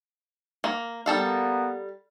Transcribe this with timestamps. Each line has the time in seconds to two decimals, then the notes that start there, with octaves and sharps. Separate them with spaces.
0.64 A#3
1.06 G3 A#3 B3 A4 F5